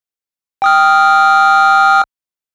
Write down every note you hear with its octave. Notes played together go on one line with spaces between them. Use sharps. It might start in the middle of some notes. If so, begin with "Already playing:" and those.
G5 D#6 F6